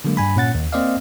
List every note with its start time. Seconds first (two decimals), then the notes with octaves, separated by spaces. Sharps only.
0.04 D3 F#3 G#3 A#3
0.17 G2 G#5 B5
0.36 A#2 C#4 F#5 A6
0.55 D#2
0.73 A#3 C4 C5 D5 D#5 F5